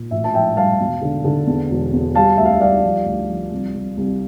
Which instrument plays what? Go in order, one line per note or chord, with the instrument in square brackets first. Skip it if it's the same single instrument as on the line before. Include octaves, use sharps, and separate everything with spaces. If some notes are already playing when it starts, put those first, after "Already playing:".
Already playing: [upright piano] A#2
A1 E5
A5
F3 E5 G5
G2 F5 A5
E1
D3
D3
E2
E1
E2
G3 F5 A5
D2 E5
F5
E5
G3 D5 F5
F3
D2
F3
C2
C2
C2